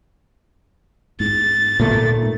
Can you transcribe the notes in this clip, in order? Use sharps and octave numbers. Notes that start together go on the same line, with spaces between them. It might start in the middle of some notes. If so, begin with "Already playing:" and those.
G#2 A6
A#2 A3